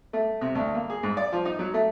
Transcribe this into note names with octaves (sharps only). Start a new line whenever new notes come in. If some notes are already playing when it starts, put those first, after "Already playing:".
A3
C3
D2
A#3
G#4
G#2
D5
F3
D#4
F#3
A3